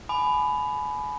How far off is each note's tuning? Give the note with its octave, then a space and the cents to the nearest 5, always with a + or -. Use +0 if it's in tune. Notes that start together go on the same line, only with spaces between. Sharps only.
G#5 +30 B5 +10 D6 +40